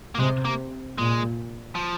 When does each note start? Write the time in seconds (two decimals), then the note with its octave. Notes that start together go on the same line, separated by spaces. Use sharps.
0.15 A#3
0.20 C3 G#3
0.45 A#3
0.98 A#2 G#3
1.75 F3